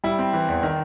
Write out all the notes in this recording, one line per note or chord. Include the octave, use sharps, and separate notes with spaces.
G3 E4
C4
E3
E2
D#3